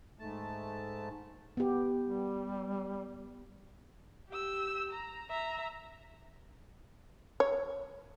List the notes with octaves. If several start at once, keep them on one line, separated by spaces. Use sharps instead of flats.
G#2 A3 A5
B3 G4
G3
G4 E6
A#5
E5 A#5
C#5